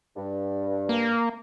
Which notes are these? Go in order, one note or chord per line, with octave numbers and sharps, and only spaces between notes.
G2
A#3